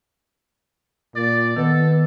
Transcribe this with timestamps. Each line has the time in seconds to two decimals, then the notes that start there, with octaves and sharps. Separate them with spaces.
1.16 A#2 D5
1.57 D#3 B3 A4